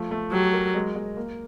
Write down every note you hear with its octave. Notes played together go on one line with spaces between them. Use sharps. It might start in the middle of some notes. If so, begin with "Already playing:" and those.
Already playing: F3 A3
A3
F#3 G4
A#4
G#3
G#3
A#3